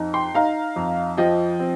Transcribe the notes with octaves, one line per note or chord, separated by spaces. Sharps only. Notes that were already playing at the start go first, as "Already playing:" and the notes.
Already playing: F2 D#4
G5 C6
D#4 F5 A#5
F2
F3 D#5 G5
C4